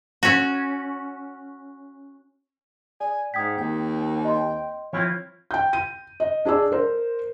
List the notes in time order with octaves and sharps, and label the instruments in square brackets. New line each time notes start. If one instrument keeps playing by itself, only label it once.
[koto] C#4 F#4
[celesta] D5 [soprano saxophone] G#5
[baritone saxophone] G#2 [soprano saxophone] G5 [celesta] D#6 G#6 B6
[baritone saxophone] D#2 [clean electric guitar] C4 [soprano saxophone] G5
[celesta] D#5 C6
[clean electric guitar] F3 C4 E4 [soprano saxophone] C#5
[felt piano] G5 G6
D#7
D#5
D4 G#4 D5 E6
A#4 C5